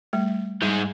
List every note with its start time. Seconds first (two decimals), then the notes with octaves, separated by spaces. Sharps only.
0.13 G3 A3
0.62 G#2 G3 G#3